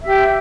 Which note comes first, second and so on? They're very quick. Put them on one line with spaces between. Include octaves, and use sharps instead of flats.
E5 G4 G5